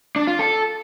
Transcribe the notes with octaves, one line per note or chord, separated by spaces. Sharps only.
D4
F4
A4